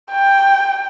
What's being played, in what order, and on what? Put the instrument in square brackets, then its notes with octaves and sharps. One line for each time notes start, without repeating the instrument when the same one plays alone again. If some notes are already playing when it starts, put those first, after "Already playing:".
[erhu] G5